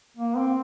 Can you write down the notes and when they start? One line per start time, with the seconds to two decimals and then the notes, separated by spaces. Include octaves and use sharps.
0.17 A#3
0.37 C4